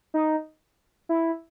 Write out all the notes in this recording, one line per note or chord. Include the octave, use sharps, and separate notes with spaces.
D#4
E4